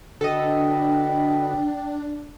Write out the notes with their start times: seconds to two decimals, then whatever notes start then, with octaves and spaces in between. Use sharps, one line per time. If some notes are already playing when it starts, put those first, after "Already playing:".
0.21 D3 D4 F#4 A4 B4 D#5 G5